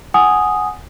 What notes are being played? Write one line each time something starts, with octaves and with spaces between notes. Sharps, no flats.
F#5 G#5 D#6